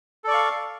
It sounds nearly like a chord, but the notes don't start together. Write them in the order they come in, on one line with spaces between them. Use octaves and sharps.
A4 D5 C#6 F5